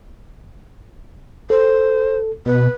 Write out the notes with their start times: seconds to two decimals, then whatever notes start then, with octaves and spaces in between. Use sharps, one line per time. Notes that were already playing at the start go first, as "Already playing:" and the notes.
1.50 A4 C5
2.46 B2 B4